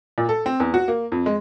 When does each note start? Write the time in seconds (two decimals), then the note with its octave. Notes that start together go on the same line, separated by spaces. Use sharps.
0.18 A#2
0.29 A4
0.46 C4
0.60 E2
0.74 F#4
0.88 A#3
1.12 F2
1.26 G#3